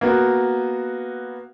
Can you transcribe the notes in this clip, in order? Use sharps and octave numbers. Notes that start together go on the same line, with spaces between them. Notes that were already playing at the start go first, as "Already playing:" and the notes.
A#3 B3 F#4